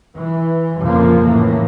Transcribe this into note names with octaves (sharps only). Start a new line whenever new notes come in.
E3
F2 A#2 C#3 F3 A#3
A2 E3 A#3